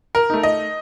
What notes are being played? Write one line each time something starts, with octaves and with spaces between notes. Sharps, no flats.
A#4
A3 D#4
D#5